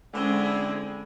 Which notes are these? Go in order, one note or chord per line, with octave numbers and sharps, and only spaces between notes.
D3 G#3 C4 C#4 E4 G#4